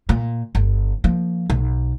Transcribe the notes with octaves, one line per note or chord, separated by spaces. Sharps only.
A#2
G1
F3 A#3
B1